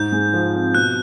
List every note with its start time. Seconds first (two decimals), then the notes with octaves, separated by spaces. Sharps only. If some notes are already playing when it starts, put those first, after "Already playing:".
Already playing: G#2 G6
0.12 G#3
0.33 F3
0.54 C4
0.75 B2 F#6